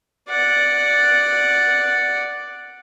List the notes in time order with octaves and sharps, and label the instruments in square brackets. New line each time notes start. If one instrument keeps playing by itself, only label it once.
[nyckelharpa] D5 F#5